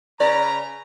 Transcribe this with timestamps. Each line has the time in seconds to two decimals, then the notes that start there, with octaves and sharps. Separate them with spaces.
0.20 C#3 B4 D5 A#5